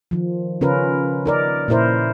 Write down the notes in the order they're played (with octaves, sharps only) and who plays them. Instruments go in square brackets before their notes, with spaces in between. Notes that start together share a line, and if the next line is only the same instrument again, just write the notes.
[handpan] D#3 F3
C#3 C#4 F4 A#4 B4
D#4 A#4 D5
A#2 C#4 E4 A#4 C5